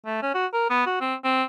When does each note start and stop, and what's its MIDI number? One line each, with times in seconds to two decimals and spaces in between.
0.06 0.18 57
0.22 0.30 61
0.34 0.46 66
0.53 0.68 70
0.70 0.85 59
0.86 0.98 66
1.00 1.15 60
1.24 1.43 60